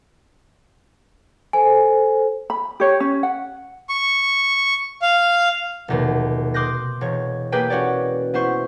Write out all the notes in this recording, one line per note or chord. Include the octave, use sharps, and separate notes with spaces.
A4 C5 G#5
B5
G4 C#5
C#4
F#5
C#6
F5
F1 D#2 B2
C6 D6 D#6 F#6 G6 A#6
E1 C#5
A#3 G4 G#4 B4 G5
C#4 F#4 C#5 D5
B3 E4 C5 C#6